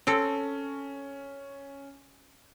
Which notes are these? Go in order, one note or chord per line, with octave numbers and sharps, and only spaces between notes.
C4 C#4 A4